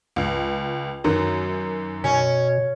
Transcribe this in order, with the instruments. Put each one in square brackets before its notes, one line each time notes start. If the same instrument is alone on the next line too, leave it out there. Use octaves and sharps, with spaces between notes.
[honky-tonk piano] C#2
F#2 D#3 F#3
[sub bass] B2 [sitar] C#4